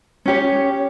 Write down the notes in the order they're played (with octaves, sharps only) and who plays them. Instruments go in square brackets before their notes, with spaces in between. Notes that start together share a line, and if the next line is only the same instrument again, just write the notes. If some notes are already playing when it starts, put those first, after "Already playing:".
[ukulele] C#4 G4 C#5